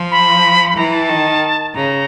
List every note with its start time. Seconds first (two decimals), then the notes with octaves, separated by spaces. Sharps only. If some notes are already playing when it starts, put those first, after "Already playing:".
Already playing: F3
0.11 B5
0.70 B5
0.77 E3 A#5
0.93 A5
1.09 D#3
1.74 C#3 A#5